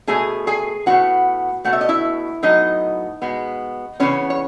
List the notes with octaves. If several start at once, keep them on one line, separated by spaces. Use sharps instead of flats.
B2 A3 G#4 G#5
G#4 G#5
A2 G#3 B3 F#4 F#5
B2 A3 F#5
E5
D#5
E4 E5
A2 F#3 B3 D#4 D#5
B2 G#3 B3
C#3 E3 B3 C#4 C#5
C#5